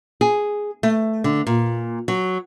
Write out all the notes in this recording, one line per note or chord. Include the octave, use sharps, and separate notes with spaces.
G#4
A3
D3
A#2
F#3